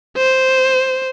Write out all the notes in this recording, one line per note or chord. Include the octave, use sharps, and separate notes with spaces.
C5